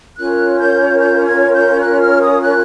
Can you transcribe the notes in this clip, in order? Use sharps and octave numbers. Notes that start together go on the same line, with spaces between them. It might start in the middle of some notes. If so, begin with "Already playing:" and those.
C#4 F4 A#4 C#5 F#6
G6
G6
G#6
G6
F#6
F6
D#6
F#6